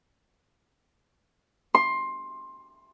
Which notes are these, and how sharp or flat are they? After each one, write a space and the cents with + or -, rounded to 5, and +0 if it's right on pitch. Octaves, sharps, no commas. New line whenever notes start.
C6 +15